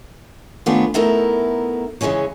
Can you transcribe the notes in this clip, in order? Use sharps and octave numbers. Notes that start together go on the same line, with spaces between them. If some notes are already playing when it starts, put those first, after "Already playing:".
D#3 A3 B3 C#4 D4 F4
A3 B3 D#4 E4 A4 A#4
C#3 E3 F3 G#3 C#4 C#5